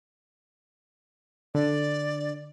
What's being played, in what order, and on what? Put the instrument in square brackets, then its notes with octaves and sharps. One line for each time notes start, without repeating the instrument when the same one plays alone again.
[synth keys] D3 [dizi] D5